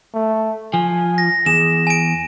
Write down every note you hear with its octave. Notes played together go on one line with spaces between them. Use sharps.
A3
F3 G#5
A#6
E2 G#4 E7
G#5 D7